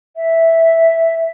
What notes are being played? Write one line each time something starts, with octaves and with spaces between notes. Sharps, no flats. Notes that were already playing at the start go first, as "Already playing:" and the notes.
E5